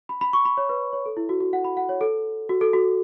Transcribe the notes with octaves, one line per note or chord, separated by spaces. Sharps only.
B5
B5
C#6
B5
C#5
B4
C#5
A4
E4
F#4
F#4
F#5
B5
F#5
C#5
A4
F#4
A4
F#4